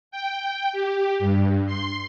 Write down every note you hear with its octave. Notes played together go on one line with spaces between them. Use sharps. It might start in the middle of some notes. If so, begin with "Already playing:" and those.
G5
G4
G2
C6